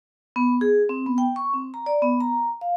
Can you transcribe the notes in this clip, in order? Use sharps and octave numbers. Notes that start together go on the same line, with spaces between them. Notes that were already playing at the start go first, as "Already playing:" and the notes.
B3
G#4
C4
B3
G5
C#6
C4
A#5
D5
B3
A#5
F5